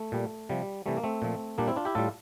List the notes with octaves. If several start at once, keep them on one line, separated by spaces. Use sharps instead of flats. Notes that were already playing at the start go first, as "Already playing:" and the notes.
Already playing: A3
A#2 G3
C3 F3 G3
C3 E3 G3 A3
A#3
A3 C4
A#2 F3
A#2 G3 A#3 D4
C4 E4
D4 F4
E4 G4
A2 G3 F4 A4